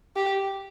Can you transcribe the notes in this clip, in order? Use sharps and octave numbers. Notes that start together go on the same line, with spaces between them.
G4